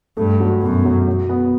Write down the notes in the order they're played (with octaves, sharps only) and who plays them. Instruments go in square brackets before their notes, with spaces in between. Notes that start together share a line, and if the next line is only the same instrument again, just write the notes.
[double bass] G2 [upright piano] A3
[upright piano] F#3
[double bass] F#2 [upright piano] B2
[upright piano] F#3
F#3
B3